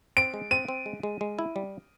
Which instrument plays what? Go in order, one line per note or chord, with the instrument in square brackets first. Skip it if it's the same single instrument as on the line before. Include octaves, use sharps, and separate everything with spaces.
[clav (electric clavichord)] C4 [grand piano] D7
[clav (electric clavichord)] G#3
[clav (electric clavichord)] C4 [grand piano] D#7
[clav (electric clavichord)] C4
G#3
G#3
G#3
E4
G3